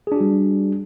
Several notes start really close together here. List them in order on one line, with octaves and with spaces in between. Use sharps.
G#4 D4 F#4 G3